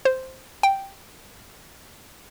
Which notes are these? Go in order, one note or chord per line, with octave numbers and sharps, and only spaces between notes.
C5
G5